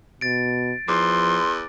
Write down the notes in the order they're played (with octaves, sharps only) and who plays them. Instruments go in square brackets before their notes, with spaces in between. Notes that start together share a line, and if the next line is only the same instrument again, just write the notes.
[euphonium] B2 [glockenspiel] A6 D7
[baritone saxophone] E2 [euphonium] F3 [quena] C6 [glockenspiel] D6